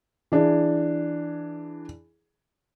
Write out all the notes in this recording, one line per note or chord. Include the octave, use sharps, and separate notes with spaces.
E3 D4 G#4